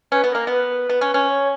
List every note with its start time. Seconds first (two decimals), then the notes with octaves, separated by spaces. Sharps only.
0.11 C#4 B4
0.24 B3
0.31 A#3 A#4
0.47 B3 B4
0.89 B3
1.01 C#4
1.14 C#4
1.27 C#5